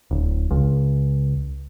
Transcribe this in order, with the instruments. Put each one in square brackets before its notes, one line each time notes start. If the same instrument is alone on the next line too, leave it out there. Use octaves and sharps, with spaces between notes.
[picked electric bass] D1
C#2